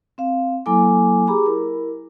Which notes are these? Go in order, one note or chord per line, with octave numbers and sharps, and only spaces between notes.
C4 F5
F#3 A#3 E4 A4 G#5 D6
G4 G#4 A#5 B5 D6
E4 A#4